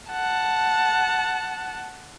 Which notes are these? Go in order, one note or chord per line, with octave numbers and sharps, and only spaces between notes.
F#5 A5